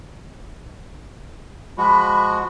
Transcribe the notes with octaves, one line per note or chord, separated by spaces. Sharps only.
F3 G#3 F#4 B5